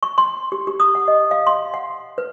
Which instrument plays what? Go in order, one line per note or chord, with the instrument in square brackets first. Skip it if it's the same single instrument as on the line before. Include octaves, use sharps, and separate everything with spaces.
[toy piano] C#6
C6
G4
G4
D#6
F#5
D#5
F5
C6
F#5
B4